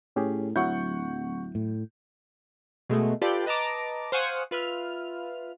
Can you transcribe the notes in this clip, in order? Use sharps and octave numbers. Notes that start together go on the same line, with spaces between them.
A2 C#4 G4 G#4
D1 F#3 E4 F#5 C#6 G6
A2
B2 G#3 A3
F4 G4 A4 B4 D5 G5
B4 D#5 A5 A#5 D6
C5 F5 F#5 G#5 C#6 D#6
F4 B4 E5 F6